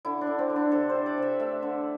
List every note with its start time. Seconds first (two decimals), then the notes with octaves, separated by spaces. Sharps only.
0.05 D3 E4
0.21 D4
0.27 D3
0.39 C4
0.49 D3
0.56 D4
0.72 C3 A4
0.89 C5
0.95 C3
1.06 D5
1.18 C3 E5
1.40 A3 E5
1.62 D3